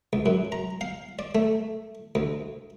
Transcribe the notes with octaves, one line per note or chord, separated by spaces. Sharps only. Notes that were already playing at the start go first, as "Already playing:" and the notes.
C#2
F#2
A#5
F5
D5
A3
D2